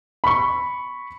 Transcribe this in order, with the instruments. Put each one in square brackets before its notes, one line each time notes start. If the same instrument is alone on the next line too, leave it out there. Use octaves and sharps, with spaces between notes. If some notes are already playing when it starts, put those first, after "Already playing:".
[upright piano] B5 C#6